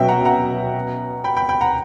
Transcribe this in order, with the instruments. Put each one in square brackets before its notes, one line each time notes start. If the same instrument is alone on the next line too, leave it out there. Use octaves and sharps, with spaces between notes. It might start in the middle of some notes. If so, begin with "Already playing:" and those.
Already playing: [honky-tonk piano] B2 F#3 C#4 F#4 [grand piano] E5 G5
[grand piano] F#5 A#5
F#5 A#5
G5 B5
G5 B5
G5 B5
F#5 A#5